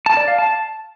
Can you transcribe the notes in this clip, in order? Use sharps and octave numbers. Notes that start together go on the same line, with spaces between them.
A5
D5
F5
A5